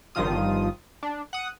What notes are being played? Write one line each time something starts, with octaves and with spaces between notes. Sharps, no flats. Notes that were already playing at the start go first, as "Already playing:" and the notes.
G1 G2 D#3 F3 F4 D#6
D4
F#5 D#6